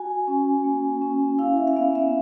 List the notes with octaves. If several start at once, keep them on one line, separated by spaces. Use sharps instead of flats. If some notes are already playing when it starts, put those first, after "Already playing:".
Already playing: F#4 G#5
C#4
A#3
C#4
E4 F5
E5
F5
B3 E5
E5